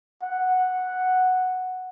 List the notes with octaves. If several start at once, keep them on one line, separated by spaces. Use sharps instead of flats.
F#5